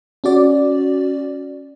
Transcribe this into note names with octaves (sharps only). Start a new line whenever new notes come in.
C#4 F#4 D5